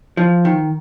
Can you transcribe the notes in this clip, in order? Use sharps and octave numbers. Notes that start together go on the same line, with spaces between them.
F3
D#3